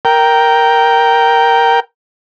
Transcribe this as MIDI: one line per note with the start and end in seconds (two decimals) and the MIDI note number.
0.05 1.80 70
0.05 1.80 79